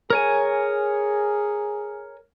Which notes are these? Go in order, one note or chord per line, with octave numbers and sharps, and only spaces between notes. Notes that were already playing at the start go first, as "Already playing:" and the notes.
G#4 A#4 C#5 G#5